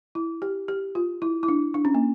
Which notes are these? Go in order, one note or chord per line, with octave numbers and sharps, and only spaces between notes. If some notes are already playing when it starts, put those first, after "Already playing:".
E4
G4
G4
F4
E4
E4
D4
D4
C#4
A#3